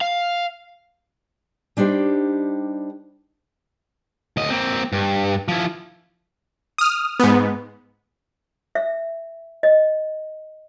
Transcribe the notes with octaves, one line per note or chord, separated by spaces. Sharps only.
F5
G3 D4 D#4 G4 C5
D2 D#5
A#3 C4
G2
F3 E4
D#6 F6
G#2 B3
E5
D#5